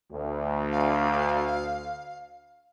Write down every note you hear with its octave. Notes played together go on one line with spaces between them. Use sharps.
D2
F5